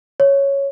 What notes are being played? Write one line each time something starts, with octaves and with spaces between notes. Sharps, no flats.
C#5